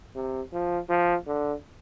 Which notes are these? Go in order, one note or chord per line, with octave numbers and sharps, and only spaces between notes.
C3
F3
F3
D3